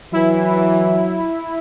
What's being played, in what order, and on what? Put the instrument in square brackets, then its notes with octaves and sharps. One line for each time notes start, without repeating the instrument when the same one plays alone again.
[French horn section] E3 [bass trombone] F#3 [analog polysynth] E4